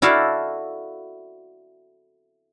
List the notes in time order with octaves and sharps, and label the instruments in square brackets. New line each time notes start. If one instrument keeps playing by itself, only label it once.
[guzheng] E4 F#4 A4 D5 F5